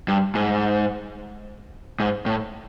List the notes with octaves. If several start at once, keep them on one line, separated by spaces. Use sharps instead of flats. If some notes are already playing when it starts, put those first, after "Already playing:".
G2
G#2
G#2
A2